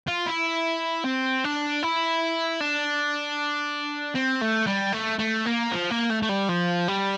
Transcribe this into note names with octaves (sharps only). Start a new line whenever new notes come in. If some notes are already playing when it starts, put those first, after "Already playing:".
F4
E4
C4
D4
E4
D4
C4
A3
G3
A3
A3
A#3
F3
A#3
A3
A3
G3
F3
G3